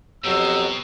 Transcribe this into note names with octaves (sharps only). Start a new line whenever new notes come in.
F2 B2 F#3 G4 B4 D#5 E6